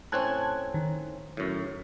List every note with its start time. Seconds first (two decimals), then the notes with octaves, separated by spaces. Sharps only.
0.12 A2 C4 C#4 A5 F#6 G#6
0.74 D#3
1.37 F#2 A2